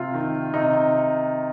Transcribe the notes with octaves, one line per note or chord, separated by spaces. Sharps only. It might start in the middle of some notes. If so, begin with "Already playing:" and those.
Already playing: C3 F4
D#3
C3 D#4
D#4